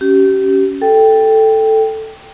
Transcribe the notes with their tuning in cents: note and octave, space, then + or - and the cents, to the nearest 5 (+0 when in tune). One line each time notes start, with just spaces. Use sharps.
C#4 +5 G4 -30
A4 +0 G5 +0